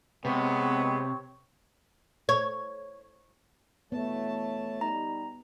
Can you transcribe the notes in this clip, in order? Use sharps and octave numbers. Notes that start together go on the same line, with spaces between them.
C3 G#3 B3 C4 C#5
C#5
E3 A3 B3 C#5 A5
G3 D#4 A#5